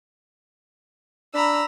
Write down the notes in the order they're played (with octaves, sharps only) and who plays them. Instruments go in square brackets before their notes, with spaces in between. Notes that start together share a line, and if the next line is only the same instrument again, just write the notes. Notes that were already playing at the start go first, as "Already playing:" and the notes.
[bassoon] D4 [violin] A#5 E6 [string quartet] B5